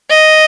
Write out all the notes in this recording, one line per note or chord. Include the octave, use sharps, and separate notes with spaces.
D#5